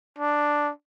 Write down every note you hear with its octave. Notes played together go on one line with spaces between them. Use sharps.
D4